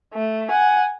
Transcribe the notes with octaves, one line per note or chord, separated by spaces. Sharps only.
A3
F#5 G#5